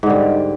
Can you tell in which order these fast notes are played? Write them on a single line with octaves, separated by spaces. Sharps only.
G#2 D3 G3